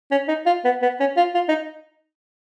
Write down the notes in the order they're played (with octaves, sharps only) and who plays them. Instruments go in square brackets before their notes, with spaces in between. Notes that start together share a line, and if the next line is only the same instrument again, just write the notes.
[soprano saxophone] C#4
D#4
F4
B3
B3
C#4
F4
F4
D#4